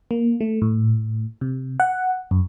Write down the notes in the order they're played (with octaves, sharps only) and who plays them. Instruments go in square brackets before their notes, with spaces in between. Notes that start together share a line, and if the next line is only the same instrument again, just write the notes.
[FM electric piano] A#3
A3
A2
C3
F#5
F#2